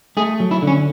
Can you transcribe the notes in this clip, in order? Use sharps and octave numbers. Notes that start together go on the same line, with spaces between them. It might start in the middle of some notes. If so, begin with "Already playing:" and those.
A3 G#4
F#3
E4
D3
C#4